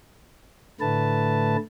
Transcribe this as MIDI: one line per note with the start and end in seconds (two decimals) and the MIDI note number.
0.81 1.57 45
0.81 1.57 50
0.81 1.57 57
0.81 1.57 71
0.81 1.57 81